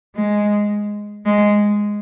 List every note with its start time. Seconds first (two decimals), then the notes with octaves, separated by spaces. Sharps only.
0.16 G#3
1.26 G#3